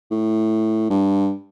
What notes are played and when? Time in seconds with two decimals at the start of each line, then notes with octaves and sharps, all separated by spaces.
0.11 A2
0.90 G2